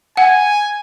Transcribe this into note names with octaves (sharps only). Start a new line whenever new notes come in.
F#5 G#5